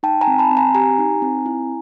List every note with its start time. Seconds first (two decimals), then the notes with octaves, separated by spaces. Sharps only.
0.03 D#4 G5 A5
0.21 G#5 A#5
0.27 C4
0.39 A5 B5
0.51 C4
0.57 G#5 A#5
0.75 G4 G#5 A#5
0.98 D#4
1.22 C4
1.46 E4